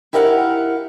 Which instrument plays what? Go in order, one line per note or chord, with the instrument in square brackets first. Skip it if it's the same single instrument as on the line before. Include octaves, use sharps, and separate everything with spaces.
[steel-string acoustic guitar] E4 G4 A#4 D5 F5 F#5